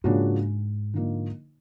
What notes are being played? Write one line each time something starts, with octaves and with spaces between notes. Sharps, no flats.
G#2 C#3 F3 A#3 D4 F#4
D3 F3 A#3 D#4